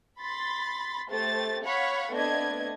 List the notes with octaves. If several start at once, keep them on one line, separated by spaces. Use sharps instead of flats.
B5 C6 A6
A3 G4 C5 A6
C#5 F5 F#5 B5 C#6
A3 B3 C4 D4 D#5 G#6